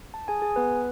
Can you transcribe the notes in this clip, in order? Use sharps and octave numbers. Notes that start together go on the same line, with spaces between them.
A5
G#4 G#5
G#4 G#5
B3 B4